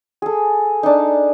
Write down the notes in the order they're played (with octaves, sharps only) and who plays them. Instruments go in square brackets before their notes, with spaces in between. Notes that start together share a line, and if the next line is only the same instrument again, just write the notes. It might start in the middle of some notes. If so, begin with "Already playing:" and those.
[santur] G#4 A4
D4 D#4